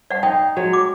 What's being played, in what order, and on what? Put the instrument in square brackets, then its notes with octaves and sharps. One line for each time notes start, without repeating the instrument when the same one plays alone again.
[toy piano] D5 F#5
[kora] D#4 [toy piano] G5
[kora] F#3 G#3 C#5
[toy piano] D6